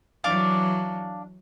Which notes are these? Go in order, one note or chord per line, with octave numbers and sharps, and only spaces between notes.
E3 F#3 D4 F5 D6